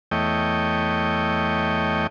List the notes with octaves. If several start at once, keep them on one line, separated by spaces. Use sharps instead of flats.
E2 A3 C#5 D#5 G5